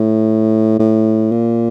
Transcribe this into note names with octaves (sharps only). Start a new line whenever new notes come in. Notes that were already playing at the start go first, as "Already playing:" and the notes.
Already playing: A2
A2
A#2